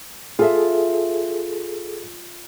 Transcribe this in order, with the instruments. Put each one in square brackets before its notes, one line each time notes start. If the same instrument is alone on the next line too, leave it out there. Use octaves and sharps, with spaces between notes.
[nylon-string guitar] F4 E5 [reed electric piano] G#4 A4